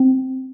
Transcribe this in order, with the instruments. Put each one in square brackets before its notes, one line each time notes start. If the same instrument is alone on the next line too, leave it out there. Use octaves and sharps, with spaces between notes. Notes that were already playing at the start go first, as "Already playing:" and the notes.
Already playing: [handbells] C4